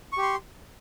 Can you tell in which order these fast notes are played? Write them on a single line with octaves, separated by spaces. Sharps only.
C#6 G4 C6